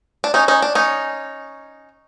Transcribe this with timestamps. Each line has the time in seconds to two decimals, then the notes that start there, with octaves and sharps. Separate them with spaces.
0.24 D4
0.34 C#4 D#4
0.48 C#4 D#4
0.62 D4
0.75 C#4 D#4